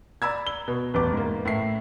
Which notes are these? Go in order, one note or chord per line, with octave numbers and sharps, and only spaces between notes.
D5 A#5 B5 E6 G#6
G7
B2
A1 E2 D6
G#2 A#3
A2 E5 C7